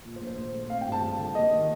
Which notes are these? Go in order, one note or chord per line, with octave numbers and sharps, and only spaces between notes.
A#2
C5
A#1
C5
A#1
A3
C4 F5
G5
G2
A5
G2
D3
A#3 D#5
D#3